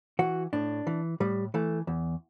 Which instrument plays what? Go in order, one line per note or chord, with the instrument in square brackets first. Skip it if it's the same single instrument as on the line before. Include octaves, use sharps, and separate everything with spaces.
[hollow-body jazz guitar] E3 F#4
A2 D4
E3
A2 G3
E3 A3
E2